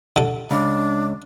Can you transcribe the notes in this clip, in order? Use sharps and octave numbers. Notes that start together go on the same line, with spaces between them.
D3 A4
C#2 D4